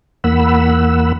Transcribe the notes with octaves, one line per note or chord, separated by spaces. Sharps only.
E2 A#3 F#5 B5 E6